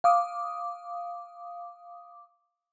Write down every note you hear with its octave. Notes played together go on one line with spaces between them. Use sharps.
F5 D6 D#6